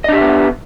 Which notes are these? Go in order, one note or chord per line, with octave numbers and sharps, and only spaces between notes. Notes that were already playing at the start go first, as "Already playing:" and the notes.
B3 D4 G4 D#5 E5